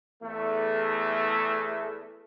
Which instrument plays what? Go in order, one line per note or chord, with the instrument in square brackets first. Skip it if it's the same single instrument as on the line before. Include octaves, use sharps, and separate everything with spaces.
[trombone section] E2 A3